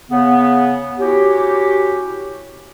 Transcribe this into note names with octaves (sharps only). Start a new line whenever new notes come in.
C#3 B3
C#4 E4 F#4 G4